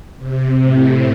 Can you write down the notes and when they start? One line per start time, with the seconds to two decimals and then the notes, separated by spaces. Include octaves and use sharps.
0.18 C3
0.62 A2